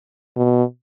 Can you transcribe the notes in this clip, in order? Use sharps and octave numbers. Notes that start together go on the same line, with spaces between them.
B2